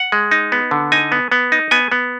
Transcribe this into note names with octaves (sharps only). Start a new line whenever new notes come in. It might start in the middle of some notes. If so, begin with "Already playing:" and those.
Already playing: F#5
G#3
D#4
B3
D3
D#4 G#5
B3
B3
D#4
B3 G#5
B3